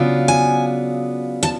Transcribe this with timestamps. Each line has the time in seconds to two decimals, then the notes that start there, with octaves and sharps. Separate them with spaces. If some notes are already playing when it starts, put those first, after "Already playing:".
Already playing: C#3 F#3 B3 D4 F4
0.28 G#5
1.43 A5